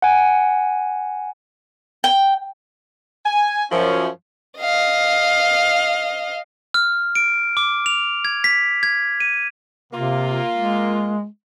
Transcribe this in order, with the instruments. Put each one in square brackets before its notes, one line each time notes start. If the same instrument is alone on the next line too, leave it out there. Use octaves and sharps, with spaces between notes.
[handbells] F#5 G#5
[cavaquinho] G5
[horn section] G#5
F#2 F3 C#4
[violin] D#5 F5
[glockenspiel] F6
D7
D6
F7
G#6
B6
G#6
D#7
[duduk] C3 [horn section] A#3 F4
[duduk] G#3